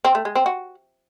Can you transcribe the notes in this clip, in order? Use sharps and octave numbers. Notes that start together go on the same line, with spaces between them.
C4
A3
G#3
C4
F#4